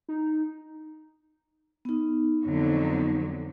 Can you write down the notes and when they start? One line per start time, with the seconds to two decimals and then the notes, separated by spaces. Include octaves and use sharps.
0.08 D#4
1.85 B3 D#4
2.43 F2 D3 F#3